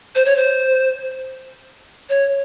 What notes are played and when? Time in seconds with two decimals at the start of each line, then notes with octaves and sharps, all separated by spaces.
0.15 C5
0.25 C#5
0.36 C5
2.09 C#5